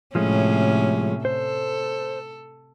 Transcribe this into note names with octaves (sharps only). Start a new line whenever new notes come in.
A2 C3 F3 G#3 A3 C#4
A4 C5